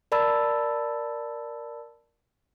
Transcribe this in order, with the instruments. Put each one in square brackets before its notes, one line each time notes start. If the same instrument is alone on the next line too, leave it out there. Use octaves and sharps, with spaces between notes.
[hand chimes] A#4 D5 A5 B5 E6 A6